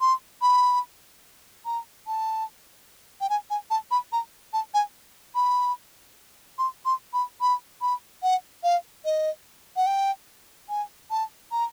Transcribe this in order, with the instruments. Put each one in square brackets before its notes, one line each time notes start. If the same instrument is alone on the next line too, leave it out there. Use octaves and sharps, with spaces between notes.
[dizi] C6
B5
A#5
A5
G5
G#5
G#5
A5
B5
A#5
A5
G#5
B5
C6
C6
B5
B5
B5
F#5
F5
D#5
F#5
G5
G#5
A5
A#5